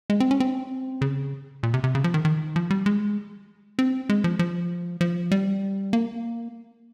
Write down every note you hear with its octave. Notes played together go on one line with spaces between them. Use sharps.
G#3
C4
C#4
C4
C#3
A#2
C3
C3
C#3
F3
D#3
D#3
F3
G3
G#3
C4
G#3
F3
F3
F3
G3
A#3